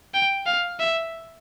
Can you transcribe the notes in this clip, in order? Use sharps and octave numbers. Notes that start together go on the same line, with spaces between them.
G5
F5
E5